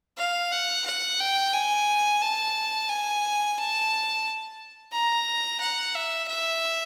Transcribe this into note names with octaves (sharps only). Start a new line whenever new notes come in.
F5
F#5
F#5
G5
G#5
A5
G#5
A5
A#5
F#5
E5
E5